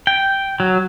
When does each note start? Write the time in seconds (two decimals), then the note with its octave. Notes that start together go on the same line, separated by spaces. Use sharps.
0.07 G5
0.60 F#3